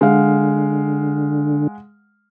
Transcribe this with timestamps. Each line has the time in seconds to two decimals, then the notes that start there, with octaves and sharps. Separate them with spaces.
0.01 D3 G#3 F5 F#5